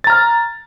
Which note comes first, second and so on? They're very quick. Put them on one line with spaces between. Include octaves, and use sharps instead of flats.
A6 A#5 F6